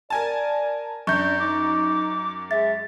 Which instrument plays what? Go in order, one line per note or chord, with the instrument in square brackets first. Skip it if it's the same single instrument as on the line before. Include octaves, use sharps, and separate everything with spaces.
[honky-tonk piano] A#4 G#5 A5 [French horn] D5
[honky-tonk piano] F#2 [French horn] D4 [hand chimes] C#6 G6
[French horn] D#4 [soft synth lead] D6
[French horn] G#3 [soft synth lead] E5 [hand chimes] A6